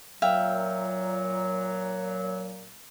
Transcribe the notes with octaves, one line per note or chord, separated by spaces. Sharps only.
A#2 F#3 E5 F5 G5